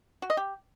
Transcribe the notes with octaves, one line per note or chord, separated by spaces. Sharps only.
F#4
D#5
G4